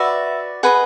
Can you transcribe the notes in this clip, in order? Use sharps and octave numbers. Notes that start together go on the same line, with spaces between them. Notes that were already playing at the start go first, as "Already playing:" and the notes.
Already playing: F#4 B4 D5 E5
G#4 B4 D#5 F#5